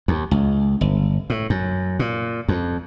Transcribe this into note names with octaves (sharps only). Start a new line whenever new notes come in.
D#2
C#2
G1
A2
F#2
A#2
F2